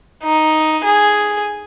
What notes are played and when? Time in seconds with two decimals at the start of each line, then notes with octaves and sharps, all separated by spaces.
0.23 D#4
0.84 G#4